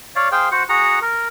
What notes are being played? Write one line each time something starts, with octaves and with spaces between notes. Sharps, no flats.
C#5 D5 F5
G#4 C5 F5 G5
F#4 C5 F#5
F#4 G#4 F#5 A#5
A#4